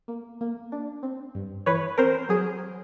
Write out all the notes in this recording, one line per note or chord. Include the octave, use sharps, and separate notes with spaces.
A#3
A#3
D4
C4
G2
E3 B4 C#5
C4 A#4 C5
F#3 G#4